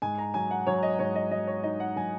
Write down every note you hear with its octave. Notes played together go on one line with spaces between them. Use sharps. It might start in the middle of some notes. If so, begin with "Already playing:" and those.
G#2 G#5
A#5
F#3 G#5
F#5
F#3 C#5
D#5
G#2 C#5
D#5
F#3 D#5
C#5
D#4 D#5
F#5
F#3 G#5